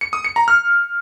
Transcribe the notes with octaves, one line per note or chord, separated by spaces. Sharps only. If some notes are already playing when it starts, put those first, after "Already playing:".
C#7
D#6
C#7
A#5
F6